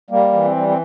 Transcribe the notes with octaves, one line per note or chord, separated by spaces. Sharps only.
G3 A#3
E3
C4
G3
C4